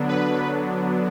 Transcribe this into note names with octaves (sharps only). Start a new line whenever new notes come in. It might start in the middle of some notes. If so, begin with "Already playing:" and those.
Already playing: D3 F#3 B3 D4
B4